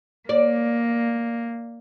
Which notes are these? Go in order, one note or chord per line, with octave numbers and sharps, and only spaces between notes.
A#3 D5